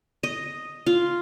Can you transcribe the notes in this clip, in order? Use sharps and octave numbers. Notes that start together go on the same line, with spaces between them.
D#5
F4